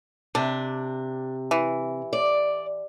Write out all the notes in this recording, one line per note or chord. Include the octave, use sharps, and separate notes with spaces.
C3 D4
E3
D5